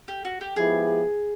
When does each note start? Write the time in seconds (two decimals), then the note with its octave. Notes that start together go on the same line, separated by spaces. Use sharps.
0.08 G4
0.25 F#4
0.41 G4
0.56 F3 G#3 B3 E4 G4 G#4